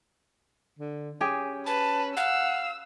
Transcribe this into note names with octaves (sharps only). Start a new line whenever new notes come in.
D3
C#4 G4 G#4 G#5
B4 A5
F5 F#5 E6